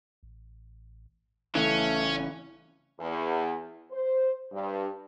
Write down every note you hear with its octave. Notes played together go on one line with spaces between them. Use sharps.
A1
G#1 C#3 E3 A3 C#4
E2
C5
G2